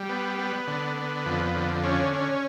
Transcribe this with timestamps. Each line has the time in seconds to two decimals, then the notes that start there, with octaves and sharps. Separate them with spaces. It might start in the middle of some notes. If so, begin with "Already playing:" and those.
Already playing: G3
0.09 B3
0.39 B3
0.67 D3
0.97 B3
1.26 F2
1.55 D3
1.84 C#4
2.13 C#4